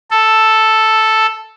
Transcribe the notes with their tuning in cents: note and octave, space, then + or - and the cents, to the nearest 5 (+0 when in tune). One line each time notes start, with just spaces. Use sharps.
A4 +0